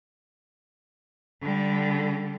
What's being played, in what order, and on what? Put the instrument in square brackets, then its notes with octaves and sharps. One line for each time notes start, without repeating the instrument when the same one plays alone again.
[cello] D3 G3